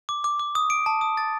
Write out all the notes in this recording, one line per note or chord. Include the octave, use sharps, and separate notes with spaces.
D6
D6
D6
D#6
D7
A5
D#6
A6